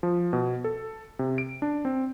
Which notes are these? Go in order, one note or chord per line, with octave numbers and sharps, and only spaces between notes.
F3
B2
A4
C3
D7
D4
C4